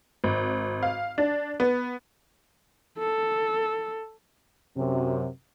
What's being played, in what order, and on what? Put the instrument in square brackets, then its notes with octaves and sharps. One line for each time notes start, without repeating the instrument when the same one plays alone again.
[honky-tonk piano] G#1
F5
D4
B3
[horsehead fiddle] A4
[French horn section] F#2 C3